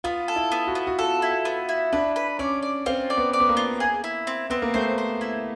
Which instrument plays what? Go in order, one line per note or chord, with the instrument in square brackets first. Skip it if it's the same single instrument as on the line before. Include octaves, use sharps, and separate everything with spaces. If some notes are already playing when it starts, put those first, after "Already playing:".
[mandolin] B3 [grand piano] F4
[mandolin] A4
[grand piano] E4
[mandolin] B3
[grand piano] F#4
[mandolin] B3
[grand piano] F#4
[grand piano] F4 [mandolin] A4
[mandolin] E4
B3
E4
[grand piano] D4 [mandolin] B4
[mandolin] B4
[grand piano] C#4 [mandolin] D5
[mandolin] D5
[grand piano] C4 [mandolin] F4
[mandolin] D5
[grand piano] B3
[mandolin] D5
[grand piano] B3
A#3
[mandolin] F4
G#4
E4
C4
[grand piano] B3 [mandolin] C4
[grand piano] A#3
[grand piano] A3 [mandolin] C5
[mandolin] C5
E4